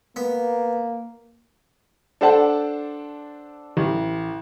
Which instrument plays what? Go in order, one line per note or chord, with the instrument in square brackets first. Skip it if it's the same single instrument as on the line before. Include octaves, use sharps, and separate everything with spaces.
[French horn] A#3 [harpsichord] B3
[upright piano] D4 A4 C5 D5 F#5 A5
A1